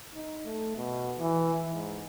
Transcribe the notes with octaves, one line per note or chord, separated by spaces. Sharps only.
D#4
A3
B2
E3
G#2